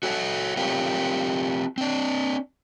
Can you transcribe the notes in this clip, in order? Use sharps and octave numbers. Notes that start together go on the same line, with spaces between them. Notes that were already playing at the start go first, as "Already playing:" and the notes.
F#4 A4 C#5 F#5
C4 F4 G4 A#4 C#5
C4 D4